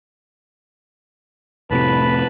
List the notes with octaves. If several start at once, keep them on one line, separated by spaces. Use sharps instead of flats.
F1 A2 C3 B4 A5 B5